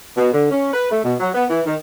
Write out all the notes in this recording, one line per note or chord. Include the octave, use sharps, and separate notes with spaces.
B2
D3
C#4
B4
A3
B2
F#3
B3
E3
D#3